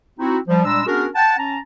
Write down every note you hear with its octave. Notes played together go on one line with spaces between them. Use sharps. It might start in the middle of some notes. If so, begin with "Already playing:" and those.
C4 D#4 E4 F#4
F3 G3
A#2 G3 G#3 D4 A#5 E6
B3 C#4 D4 F#4 G#4 A#4
F#5 G5 A5
C#4 A5 A#5